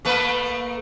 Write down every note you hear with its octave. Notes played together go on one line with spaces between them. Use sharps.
A3 A#3 B4